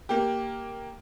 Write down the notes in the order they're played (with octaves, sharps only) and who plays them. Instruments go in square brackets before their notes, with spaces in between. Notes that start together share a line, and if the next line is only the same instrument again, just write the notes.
[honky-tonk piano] A#3 G4